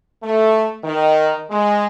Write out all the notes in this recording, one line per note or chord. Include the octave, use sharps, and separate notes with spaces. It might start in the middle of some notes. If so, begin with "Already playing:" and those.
A3
D#3
G#3